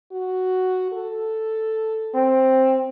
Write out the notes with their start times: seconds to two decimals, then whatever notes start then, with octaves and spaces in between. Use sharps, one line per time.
0.12 F#4
0.92 A4
2.15 C4